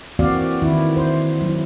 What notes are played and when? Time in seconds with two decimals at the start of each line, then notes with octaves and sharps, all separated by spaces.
0.19 E3 A#3 C4 F#4 D5 F5
0.62 D#3 E4
0.96 C5
1.41 F#3 E4